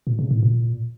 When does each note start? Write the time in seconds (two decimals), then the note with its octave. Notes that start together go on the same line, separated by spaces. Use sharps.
0.07 A#2
0.19 C#3
0.31 A2
0.43 A#2